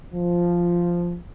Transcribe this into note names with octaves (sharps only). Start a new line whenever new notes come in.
F3